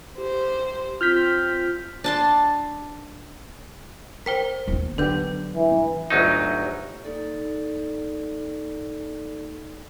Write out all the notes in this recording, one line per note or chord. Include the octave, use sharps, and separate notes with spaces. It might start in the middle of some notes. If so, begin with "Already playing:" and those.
G4 C5
C4 F4 F6 G6 B6
D4 A5 C6
A#4 C5 G5 B6
D#2 B3
D3 F#3 B3 G4 B4 G6
E3
G1 D2 F#3 D#4
A#3 D#4 A4 D5